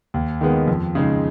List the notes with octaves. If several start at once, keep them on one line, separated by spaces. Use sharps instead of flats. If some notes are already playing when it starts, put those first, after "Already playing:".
D#2
D#3 G#3 B3
F2
C#3 G#3 D#4